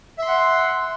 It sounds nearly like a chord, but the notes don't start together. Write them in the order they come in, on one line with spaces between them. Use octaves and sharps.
E5 C6 F#5